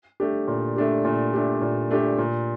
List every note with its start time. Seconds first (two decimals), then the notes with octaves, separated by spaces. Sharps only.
0.20 A3 D4 G4
0.48 A#2
0.76 A3 D4 G4
1.05 A#2
1.34 A3 D4 G4
1.61 A#2
1.91 A3 D4 G4
2.18 A#2